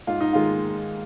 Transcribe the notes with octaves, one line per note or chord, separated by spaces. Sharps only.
G#2 F4
D#4
D#3 G#3 F4